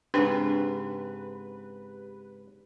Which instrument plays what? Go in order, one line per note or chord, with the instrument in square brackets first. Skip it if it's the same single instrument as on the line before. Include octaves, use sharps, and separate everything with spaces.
[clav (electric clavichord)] G#2 C#3 C4 [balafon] D4 [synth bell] G4 [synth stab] B4